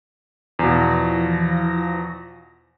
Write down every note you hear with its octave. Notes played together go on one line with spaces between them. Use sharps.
E2 B2 E3 F3 A#6